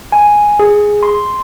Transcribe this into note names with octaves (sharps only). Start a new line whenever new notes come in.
G#5
G#4
C6